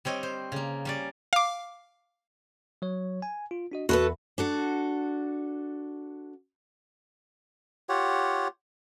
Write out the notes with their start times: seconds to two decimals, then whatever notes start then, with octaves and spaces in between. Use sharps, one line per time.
0.05 G3 C4 C#5 D#5
0.23 C5
0.52 C#3 A#3
0.85 G3 C#4 D5
1.33 F5 D6
2.82 F#3 C#5
3.22 G#5
3.51 F4
3.72 D4 F#4 D#5
3.89 E2 F#4 A4 B4 E5 B5
4.38 D4 F#4 A4
7.89 F4 G4 C#5 F#5